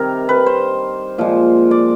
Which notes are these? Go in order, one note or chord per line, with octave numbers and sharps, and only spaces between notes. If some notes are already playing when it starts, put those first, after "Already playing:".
Already playing: C3 D#3 G3 A#4
B4
C5
A#2 F3 G#3
D5